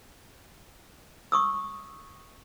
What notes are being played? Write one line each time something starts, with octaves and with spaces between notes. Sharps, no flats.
C#6 D#6 E6